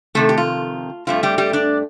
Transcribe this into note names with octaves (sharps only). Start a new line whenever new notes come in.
F2 C3 D#3 A3 A4
G4
F4
G2 F3 A3 C4 F4
G3 G4
G3 G4
D4 D5